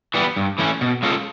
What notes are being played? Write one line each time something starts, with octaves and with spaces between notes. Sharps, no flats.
E3 G3 B3
G2
E3 A3 C#4
B2
G#3 C#4 F4 A4